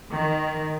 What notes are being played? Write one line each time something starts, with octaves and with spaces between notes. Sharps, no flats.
D#3